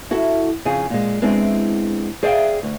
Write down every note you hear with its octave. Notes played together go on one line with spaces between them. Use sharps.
E4 F#4 A4
F2 C#3 F3 G#4
A#2 G#3
G#3 B3 C4 D4 E4
G#4 C5 D5 E5 F5 G5
D2